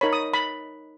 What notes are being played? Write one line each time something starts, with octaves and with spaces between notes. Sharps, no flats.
D#4 A#4 C#5 B5
D#6
B5